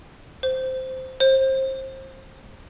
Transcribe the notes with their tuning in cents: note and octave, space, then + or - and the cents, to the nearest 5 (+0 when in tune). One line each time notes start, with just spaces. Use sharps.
C5 -10
C5 +25